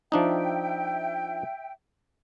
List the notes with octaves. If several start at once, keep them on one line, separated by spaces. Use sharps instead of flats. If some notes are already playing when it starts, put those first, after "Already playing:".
F3 D4 D#4 E5 G5